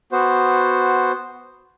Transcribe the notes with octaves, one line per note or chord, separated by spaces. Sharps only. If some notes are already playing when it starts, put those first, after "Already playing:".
B3 F#4 C5